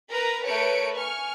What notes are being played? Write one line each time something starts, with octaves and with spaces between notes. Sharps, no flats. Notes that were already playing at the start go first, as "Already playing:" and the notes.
A#4 B4 A#5
A3 A#4 B4 C#5 C#7 D7
G#5 C#6 F6